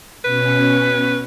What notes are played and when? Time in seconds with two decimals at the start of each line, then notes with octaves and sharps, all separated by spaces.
0.24 B2 C#4 B4